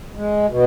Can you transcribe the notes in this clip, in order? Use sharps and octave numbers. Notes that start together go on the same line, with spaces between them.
G#3
B2